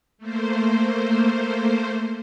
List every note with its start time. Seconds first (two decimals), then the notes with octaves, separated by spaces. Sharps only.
0.18 A3 A#3 C5